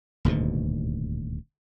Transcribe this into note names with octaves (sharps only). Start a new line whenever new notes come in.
D#1 D2 G#2 B2